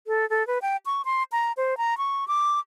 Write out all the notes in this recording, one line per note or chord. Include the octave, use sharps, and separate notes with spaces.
A4
A4
B4
G5
C#6
C6
A#5
C5
A#5
C#6
D6